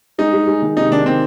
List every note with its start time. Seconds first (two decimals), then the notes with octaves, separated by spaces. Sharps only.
0.18 G#3 D#4
0.33 G#3
0.48 G#3
0.62 D#3
0.76 C3 D#4
0.91 D#3 D4
1.06 D#3 C4